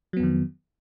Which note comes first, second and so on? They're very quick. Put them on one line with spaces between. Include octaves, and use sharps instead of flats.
F#3 B3 F2 D#3